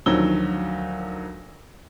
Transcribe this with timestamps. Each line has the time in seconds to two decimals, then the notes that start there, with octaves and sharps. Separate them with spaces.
0.06 D2 D#3 F3 F#3 E6 G7